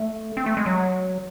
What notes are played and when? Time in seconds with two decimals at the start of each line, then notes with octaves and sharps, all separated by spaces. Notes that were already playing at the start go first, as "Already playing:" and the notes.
Already playing: A3
0.37 C4
0.46 A3
0.57 G#3
0.66 F#3